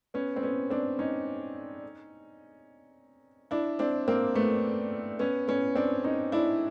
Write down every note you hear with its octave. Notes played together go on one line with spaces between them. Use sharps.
B3 C#4
C4
B3 C#4
C4 D4
C#4 D#4
D4 E4
C4 D4
A#3 C4
A3 B3
B3 C#4
B3 C#4
C4 D4
C#4 D#4
D4 E4